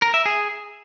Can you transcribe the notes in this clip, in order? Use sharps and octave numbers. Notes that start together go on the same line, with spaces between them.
A#4
E5
G#4